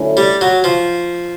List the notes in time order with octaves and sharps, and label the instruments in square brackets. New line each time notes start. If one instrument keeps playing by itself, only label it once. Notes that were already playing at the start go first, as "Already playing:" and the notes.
Already playing: [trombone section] D3 F#3 A3 C#4 E4
[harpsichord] G3
F#3
F3